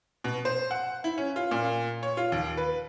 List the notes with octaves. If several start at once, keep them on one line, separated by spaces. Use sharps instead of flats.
B2
C5
F#5
E4
C#4
F4
A#2
C#5
F4
D#2
B4